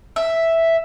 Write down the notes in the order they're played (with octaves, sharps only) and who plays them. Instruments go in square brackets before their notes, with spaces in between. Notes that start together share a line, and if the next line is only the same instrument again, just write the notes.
[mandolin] E5